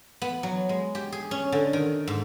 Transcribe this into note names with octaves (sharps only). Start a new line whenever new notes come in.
B3
F#3
G#3
G4
G#4
C#4
D3
D#3
G#2